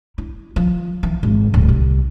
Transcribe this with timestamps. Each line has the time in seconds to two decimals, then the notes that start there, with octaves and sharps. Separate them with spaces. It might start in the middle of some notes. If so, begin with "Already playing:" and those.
0.18 E4
0.56 F3
1.03 E3
1.23 G#1
1.54 D1
1.68 C2